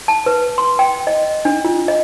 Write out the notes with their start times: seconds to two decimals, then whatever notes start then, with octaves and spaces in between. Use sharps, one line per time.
0.08 A5
0.26 B4
0.58 C6
0.79 G5
1.07 D#5
1.45 D4
1.65 F4
1.88 D#5